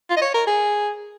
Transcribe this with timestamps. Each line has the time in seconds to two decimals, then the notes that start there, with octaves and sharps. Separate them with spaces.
0.10 F4
0.17 D#5
0.22 C#5
0.35 A#4
0.47 G#4